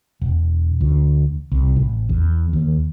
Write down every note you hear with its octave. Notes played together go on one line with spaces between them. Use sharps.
E1
D2
C2
A1
E2
D#2